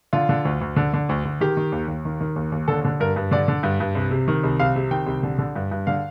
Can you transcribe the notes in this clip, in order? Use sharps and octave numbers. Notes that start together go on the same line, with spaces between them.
D3 F4
D3
D2
D2
D3
D3
D2
D2
D#3 G4
D#3
D#2
D#2
D#3
D#3
D#2
D#2
D3 A4
D3
G2 A#4
G2
D3 D5
D3
G2
G2
C2
C3
D#3
C2
C2 F5
C3
D#3 G5
C2
D3
D3
G2
G2
D3 F5